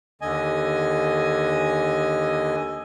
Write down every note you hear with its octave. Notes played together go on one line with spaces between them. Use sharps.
D#2 D3 D#5 G#5